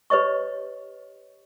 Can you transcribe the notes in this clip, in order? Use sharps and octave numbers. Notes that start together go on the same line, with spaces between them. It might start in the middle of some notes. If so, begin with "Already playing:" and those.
G4 B4 C#5 D#5 C#6